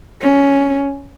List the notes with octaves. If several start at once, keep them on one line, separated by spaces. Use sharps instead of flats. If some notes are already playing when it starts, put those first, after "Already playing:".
C#4